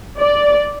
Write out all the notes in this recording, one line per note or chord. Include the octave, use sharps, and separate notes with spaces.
D5